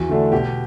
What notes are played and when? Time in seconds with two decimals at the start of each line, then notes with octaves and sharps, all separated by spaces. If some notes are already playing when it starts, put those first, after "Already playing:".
Already playing: E2 F#4
0.09 D3 A3 D4
0.32 B2 G4